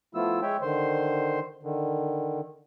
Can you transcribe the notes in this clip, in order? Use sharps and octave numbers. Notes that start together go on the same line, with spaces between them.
F3 A3 B3 E4 F4 E6
G#3 C#5 E5 G5
D3 D#3 C5 C6
D3 D#3